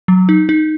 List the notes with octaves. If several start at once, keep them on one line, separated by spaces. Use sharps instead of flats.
F#3
D#4
D#4